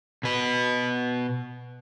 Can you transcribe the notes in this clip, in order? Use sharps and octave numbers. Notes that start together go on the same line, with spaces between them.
B2 B4